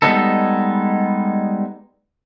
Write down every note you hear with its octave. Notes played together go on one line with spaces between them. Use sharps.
G3 G#3 B3 D#4 A4